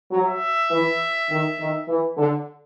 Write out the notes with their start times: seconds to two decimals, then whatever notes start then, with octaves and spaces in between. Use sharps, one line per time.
0.11 F#3
0.26 E5
0.71 E3
1.30 D#3
1.59 D#3
1.88 E3
2.18 D3